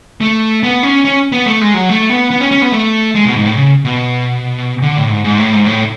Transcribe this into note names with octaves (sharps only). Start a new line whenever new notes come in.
A3
B3
C#4
C#4
B3
A3
G#3
F#3
A3
B3
B3
C#4
C#4
B3
A3
G#3
B2
G#2
A2
C#3
B2
D3
A2
G#2
G#2
A2
G#2
A2